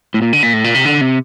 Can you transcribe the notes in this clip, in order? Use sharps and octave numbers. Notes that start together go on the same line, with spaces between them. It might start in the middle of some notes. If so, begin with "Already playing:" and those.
A2
A#2
D3
A#2
A2
A#2
C3
D3
C3